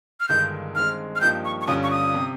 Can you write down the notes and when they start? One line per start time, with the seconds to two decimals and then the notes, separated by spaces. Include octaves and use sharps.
0.20 F6
0.29 G1 G2 D#3 G#3 D#4 G6
0.75 G2 D#3 G#3 C4 F6
1.16 F6
1.21 G2 F3 A#3 D#4 G4 G6
1.45 C#6
1.61 C#6
1.67 G1 G2 G3 C#4 F4 D#6
1.83 C#6
1.91 D#6
2.14 C3